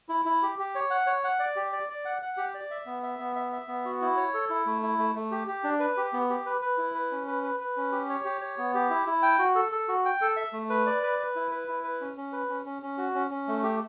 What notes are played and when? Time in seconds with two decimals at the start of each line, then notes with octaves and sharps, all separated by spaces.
0.09 E4
0.25 E4
0.43 G4
0.59 G4
0.75 C#5
0.91 F#5
1.07 C#5
1.24 F#5
1.39 D5
1.56 G4
1.72 D5
1.89 D5
2.05 F#5
2.22 F#5
2.37 G4
2.55 D5
2.71 E5
2.86 B3
3.03 E5
3.19 B3
3.36 E5
3.53 E5
3.68 B3
3.85 F#4
4.02 E4
4.17 C#5
4.34 A4
4.50 E4
4.66 A3
4.83 E4
4.98 A3
5.16 A3
5.31 G4
5.48 G4
5.64 D4
5.80 B4
5.97 G4
6.13 B3
6.30 G4
6.46 B4
6.61 B4
6.78 E4
6.95 B4
7.12 C#4
7.27 B4
7.43 B4
7.60 B4
7.77 C#4
7.92 G4
8.09 C#5
8.25 G4
8.41 C#5
8.58 B3
8.74 G4
8.90 E4
9.06 E4
9.23 G5
9.39 F#4
9.55 A4
9.72 A4
9.88 F#4
10.05 G5
10.21 A4
10.37 E5
10.53 A3
10.70 B4
10.86 D5
11.03 B4
11.19 B4
11.36 E4
11.51 B4
11.68 E4
11.84 B4
12.01 C#4
12.17 C#4
12.33 B4
12.49 C#4
12.65 C#4
12.82 C#4
12.98 F#4
13.14 C#4
13.31 C#4
13.48 A3
13.63 G4